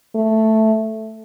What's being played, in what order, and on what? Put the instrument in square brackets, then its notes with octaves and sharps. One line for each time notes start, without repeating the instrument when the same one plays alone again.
[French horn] A3